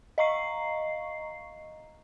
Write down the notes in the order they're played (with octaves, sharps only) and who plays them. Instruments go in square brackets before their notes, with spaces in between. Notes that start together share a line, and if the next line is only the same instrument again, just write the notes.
[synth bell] D#5 F5 A#5 C#6 C7